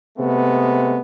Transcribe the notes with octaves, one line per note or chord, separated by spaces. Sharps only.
C3 G#3 A3 B3